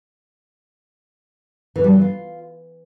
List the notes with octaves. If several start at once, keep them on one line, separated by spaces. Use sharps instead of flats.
E3
G3
E3
F4